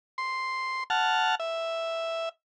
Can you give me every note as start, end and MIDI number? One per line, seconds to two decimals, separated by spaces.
0.18 0.84 84
0.90 1.35 78
0.90 1.35 81
0.90 1.35 89
1.40 2.29 76